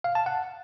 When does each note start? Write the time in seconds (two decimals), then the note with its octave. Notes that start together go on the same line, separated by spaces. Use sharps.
0.04 F5
0.15 A5
0.26 F#5